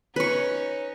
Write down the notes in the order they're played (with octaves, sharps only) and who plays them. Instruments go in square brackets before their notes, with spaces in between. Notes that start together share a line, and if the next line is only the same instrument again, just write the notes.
[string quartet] C#4 D#4 [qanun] B4 C#6